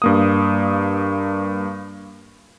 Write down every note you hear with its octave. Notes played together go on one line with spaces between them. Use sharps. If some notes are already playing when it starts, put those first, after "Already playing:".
G2 A#3 D#6